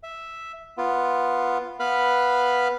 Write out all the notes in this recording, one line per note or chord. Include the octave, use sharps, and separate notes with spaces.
E5
B3 F4
B3 B4 F5 B5